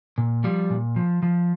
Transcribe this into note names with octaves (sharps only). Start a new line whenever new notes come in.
A#2
F3 G3
A#2
F3
F3